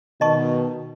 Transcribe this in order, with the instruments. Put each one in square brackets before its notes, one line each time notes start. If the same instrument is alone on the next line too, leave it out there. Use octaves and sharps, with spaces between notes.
[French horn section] B2 D#3 [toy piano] D#5 A5 C#6